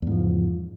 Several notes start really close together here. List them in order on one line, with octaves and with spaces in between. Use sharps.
E2 G#2 F3 C#3